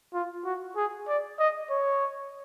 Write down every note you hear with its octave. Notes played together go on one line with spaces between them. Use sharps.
F4
F#4
G#4
D5
D#5
C#5